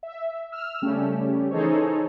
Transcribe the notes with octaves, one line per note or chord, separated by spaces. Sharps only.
E5
E6 F6
C#3 G3 A3 C#4 G4
E3 D#4 G#4 A4 C5 C#5